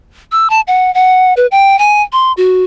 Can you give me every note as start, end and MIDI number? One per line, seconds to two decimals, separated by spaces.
0.32 0.50 88
0.50 0.61 81
0.67 0.93 78
0.94 1.33 78
1.37 1.46 71
1.52 1.79 79
1.79 2.02 80
2.13 2.32 84
2.37 2.65 66